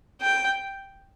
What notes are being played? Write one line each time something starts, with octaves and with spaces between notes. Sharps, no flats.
G5